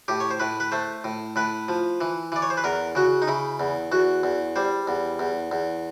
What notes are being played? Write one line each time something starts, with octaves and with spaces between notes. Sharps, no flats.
A2 G4
C#5
C5
A2 B4
B4
A3 C5
A2
A2 B4
F3
E3
E3 D5
C#5
C5
B4
E2 A#4
C#3 F#4
D#4
C#3 E4
E2
E2 F#4
E2
G3 C5
E2
E2
E2